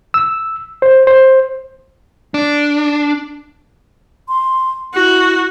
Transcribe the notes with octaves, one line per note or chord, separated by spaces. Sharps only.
E6
C5
C5
D4
C6
E4 F#4